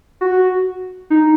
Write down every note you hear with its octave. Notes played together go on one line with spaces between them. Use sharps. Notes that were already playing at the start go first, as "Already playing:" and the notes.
F#4
D#4